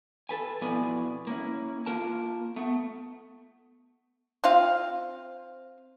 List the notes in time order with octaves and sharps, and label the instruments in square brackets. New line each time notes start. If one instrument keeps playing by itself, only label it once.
[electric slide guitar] A4 B4 G#5
F2 B2 B3 E4 D5 G#5
A#3 C#4 E4
A#3 F4 A#4 A5
A3 B3
[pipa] C4 F4 F5